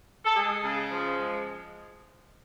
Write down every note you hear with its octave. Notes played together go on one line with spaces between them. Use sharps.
A4
G#3 G#4
C#3
F3
G#3